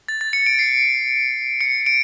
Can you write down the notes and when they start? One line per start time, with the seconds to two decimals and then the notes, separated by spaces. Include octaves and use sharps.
0.08 A6
0.21 A6
0.33 C#7
0.46 D7
0.59 C7
1.61 C#7
1.86 D7